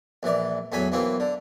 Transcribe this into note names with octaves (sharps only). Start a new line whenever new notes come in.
A#1 E3 D5
E2 A2 F#3 G#5 B5
B1 E3 A#3 C4
D3